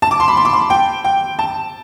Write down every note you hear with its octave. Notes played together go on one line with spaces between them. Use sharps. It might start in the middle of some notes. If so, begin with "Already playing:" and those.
A5
D6
C6
B5
C6
D6
C6
G5
G5
A5